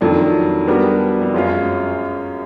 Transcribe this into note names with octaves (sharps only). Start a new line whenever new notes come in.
F2 D#3 F#3 A3 D4
G3 B3 D4 F#4 A#4
F2
F#2 G#3 C#4 F4